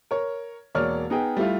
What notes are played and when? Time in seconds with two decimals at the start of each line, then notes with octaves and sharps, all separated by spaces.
0.11 A#4 C#5
0.75 E1 A#3 C#5 D5 F6
1.10 B3 D#4 G#4 G5
1.37 G3 A3 E4 F4